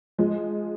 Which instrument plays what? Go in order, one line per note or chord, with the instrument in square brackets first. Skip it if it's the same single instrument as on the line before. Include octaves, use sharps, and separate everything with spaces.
[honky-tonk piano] F3 G#3